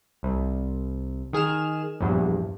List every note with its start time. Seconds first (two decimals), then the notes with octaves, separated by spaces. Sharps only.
0.23 C2
1.33 D#3 G#4 F6 E7
2.01 A#1 E2 G2